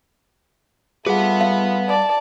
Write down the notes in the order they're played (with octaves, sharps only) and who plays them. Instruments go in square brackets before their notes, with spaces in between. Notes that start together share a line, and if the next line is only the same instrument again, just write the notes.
[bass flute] G3 [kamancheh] A3 F4 [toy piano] G#4 [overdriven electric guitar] B4 F#5
[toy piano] F5
[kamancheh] D5 A5